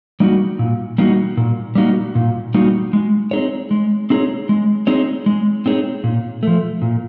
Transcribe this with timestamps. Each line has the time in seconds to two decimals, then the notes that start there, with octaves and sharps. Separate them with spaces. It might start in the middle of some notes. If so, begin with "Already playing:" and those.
0.20 G3 A#3 D#4 F#4
0.59 A#2
0.98 G3 A#3 D#4 F#4
1.37 A#2
1.75 G3 A#3 D#4 F#4
2.15 A#2
2.54 G3 A#3 D#4 F#4
2.93 G#3
3.31 C4 D#4 G#4 C#5
3.71 G#3
4.10 C4 D#4 G#4 C#5
4.49 G#3
4.87 C4 D#4 G#4 C#5
5.26 G#3
5.66 C4 D#4 G#4 C#5
6.04 A#2
6.43 F3 A3
6.82 A#2